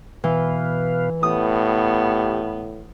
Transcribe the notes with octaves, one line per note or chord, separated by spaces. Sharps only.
B2 E3 B4 F5
A2 B3 G4 D#6